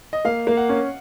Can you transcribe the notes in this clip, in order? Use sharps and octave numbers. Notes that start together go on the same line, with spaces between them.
D#5
A#3 F5
A#3
F#5
C#4